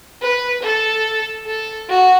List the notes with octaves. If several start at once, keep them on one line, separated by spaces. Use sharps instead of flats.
B4
A4
A4
F#4